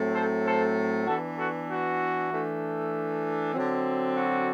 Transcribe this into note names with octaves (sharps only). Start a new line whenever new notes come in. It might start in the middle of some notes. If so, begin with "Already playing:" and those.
Already playing: A2 F#3 A3 C4
A4 C5
A4 C5
E3 B3 D4 F#4 A4
F#4 A4
F#4
E3 A3 D4
D3 F#3 C4
F#4